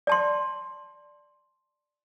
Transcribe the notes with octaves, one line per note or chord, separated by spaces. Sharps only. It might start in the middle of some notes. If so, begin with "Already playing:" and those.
D5 A5 C6